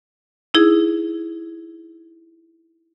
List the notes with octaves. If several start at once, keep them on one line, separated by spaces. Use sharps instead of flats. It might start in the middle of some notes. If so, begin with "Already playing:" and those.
D#4 E4 G#4